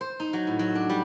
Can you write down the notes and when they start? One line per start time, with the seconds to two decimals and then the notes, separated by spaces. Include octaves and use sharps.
0.01 C5
0.20 D#4
0.33 F#3
0.47 A2
0.59 F#3
0.75 D4
0.90 G3